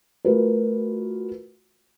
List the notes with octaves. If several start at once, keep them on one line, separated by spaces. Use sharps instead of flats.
A3 F4 F#4 A#4 B4